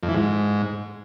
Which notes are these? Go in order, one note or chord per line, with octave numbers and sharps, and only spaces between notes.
F2
E3
G#2